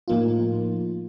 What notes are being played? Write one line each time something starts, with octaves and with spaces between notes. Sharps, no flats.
A2 F3 A#3 D#4 F4